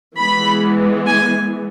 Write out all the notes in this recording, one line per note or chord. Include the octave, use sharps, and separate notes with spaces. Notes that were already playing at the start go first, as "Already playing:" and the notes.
E3 G#3 B3 B5
G#5